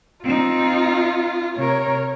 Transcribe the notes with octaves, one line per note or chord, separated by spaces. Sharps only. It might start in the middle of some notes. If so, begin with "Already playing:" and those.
C4 D#4 F4
C3 A#4 C#5